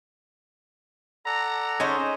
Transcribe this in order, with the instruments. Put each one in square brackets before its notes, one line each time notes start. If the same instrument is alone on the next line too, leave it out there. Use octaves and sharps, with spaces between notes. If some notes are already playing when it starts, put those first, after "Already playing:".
[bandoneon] A4 D5 F#5 [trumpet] A#5
[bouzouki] C#4 D#4 C#5 [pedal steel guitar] G#4 C5